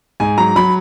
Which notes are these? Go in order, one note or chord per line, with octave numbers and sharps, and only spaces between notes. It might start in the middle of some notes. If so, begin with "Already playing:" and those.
G#2 G#5
F#3 A#5
F#3 B5